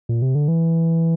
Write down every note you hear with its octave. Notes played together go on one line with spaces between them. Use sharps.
A#2
C3
D3
E3